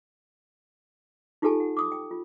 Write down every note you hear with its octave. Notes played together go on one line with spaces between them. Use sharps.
D#4 F4 G4 A4 G#5 A5
F#5
D6 D#6
G5
F4